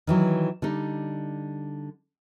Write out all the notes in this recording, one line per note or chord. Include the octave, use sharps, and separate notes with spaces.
D#3 E3 F#3
D3 G3 D#4